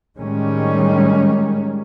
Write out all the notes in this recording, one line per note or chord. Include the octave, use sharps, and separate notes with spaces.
A2 D#3 G3 G#3 C#4